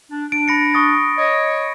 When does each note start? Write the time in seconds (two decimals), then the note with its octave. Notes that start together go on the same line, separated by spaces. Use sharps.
0.11 D4
0.32 D4 D7
0.48 B5 A#6 C#7
0.74 C#6 D#6 A6
1.17 C#5 D#5